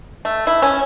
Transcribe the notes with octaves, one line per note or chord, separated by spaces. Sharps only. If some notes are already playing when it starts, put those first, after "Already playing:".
A3
E4
C#4